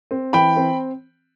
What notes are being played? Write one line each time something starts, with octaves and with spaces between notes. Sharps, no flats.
C4
E3 G5 B5
C4